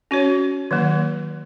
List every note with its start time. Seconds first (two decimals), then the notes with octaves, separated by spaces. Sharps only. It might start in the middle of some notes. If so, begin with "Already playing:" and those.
0.11 C#4 F#4 C#5
0.71 D#3 F#3 A#3